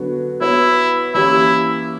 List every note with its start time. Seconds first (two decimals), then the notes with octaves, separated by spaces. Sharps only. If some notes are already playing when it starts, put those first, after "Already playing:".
Already playing: D3 F#3 B3 F#4
0.40 B3 E4 F#4 C#5
1.14 E3 A#3 C#4 E4 G4